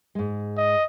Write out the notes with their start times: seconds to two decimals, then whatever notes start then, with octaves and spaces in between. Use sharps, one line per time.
0.15 G#2 G#3
0.57 D#5